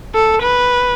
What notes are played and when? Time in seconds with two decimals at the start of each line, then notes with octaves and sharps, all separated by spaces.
0.15 A4
0.43 B4